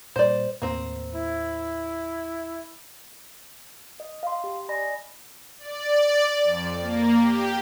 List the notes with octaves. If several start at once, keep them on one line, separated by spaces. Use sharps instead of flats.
A#2 G3 C5 D5
D#2 A2 A#3 C4
E4
D#5
F5 C6
G4
D5 D#5 G#5 B5 A#6
D5
F2
A#3
G4